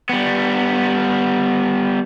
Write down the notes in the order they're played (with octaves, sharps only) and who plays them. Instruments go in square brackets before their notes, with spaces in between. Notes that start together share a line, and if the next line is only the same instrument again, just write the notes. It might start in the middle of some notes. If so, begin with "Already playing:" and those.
[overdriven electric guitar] G3 B3